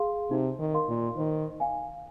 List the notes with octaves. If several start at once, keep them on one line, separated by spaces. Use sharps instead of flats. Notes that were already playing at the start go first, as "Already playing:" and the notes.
Already playing: G#4 F5 C6
C3 D#4
D#3
A#4 F5 C6
A#2
D#3 C5
F5 G#5